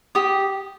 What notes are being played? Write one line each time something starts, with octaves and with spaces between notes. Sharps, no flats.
G4 D#6